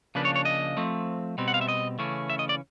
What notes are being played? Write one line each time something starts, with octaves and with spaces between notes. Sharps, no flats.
C#3 F3 A#3 D4 B4
C#5
C#5
D#5
F3 A3 C4
B2 G3 C4
F#5
F5
E5
D#5
C#3 E3 A3 C#4
E5
D#5
D5